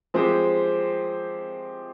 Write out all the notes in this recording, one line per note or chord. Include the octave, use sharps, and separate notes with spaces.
F3 G#3 C4 G4 C5